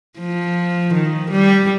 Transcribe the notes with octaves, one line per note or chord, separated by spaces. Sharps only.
F3
D#3
G3